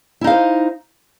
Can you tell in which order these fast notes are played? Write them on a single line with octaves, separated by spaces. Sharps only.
E4 D#4 F5 C5